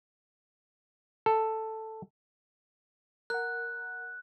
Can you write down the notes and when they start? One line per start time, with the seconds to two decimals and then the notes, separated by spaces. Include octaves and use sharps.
1.26 A4
3.30 A#4 F#5 F#6